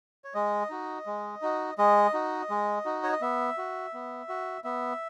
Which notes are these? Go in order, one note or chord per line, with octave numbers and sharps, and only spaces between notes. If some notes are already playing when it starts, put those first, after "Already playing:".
C#5
G#3 D#5
D#4 F#4
G#3
D#4 F#4
G#3 D#5
D#4 F#4
G#3
D#4 F#4
C#5
D#5
B3 E5
F#4
B3
F#4
B3 E5